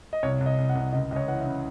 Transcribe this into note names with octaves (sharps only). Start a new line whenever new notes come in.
D#5
C2 C#5
C2
D#5
C2
F#5
C2
C#2 D#5
C#2 D#5
C#5
E3 F#5
E5
C#3